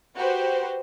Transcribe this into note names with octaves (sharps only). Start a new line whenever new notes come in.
F#4 G4 B4 C5